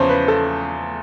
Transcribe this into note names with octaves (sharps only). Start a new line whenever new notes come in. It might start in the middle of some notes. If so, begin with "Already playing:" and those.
Already playing: E2 C#3 F3 C5 C#5
B4
A4